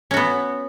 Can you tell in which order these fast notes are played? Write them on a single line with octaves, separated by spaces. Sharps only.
C#4 F#4 B3